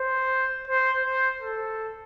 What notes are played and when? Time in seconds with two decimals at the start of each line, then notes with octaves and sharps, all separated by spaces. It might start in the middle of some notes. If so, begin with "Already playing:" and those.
Already playing: C5
0.68 C5
1.05 C5
1.42 A4